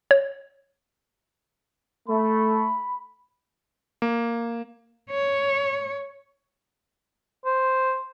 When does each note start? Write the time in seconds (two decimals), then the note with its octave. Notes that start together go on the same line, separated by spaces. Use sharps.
0.11 C#5
2.08 A3 B5
4.02 A#3
5.10 C#5
7.46 C5